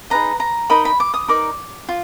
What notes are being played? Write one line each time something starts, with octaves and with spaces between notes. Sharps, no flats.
D#4 G#4 B4 D#5 A#5
A#5
D#4 A#4 D#5 B5
B5
D6
D#6
D#4 A#4 D5 D6
F4